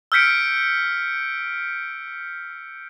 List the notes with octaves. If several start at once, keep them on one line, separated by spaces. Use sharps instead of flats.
E6 F6 G6 B6 C#7 D7